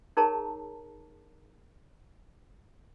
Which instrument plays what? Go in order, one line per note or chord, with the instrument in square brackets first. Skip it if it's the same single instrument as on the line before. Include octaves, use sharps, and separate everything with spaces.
[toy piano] D#4 G#4 A#4 C#5 A5 A#5